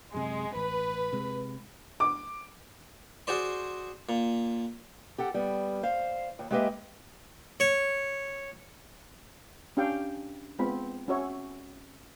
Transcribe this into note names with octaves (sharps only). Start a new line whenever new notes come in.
F#2 C3 G#3
A1 B4
C3 G#3
D6
F#4 G#4 C5 D5 C6
A#2
G4 A4 F#5
G3 B3
C5 F5
D#2
G#3 A#3 G4 B4 D#5 E5
C#5
C#4 D4 G4 F5 G5
G#3 B3 C4 F4 B5
C#4 F#4 C#5 E5